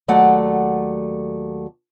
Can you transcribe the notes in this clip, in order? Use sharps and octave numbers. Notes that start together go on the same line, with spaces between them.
D#2 F#3 A3 D5 F#5